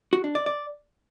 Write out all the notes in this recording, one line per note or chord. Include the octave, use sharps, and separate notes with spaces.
F#4
D4
D5
D5